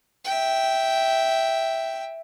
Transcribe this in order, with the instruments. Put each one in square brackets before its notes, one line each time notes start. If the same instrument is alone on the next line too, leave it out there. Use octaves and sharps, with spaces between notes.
[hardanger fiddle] E5 G5